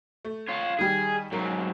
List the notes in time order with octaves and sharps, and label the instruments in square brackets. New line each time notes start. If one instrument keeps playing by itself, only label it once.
[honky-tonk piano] A3
[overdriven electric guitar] F4 C#5
[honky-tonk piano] D#3 G3 G4 [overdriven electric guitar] G#4
[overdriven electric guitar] G#2 F#3 [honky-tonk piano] A#4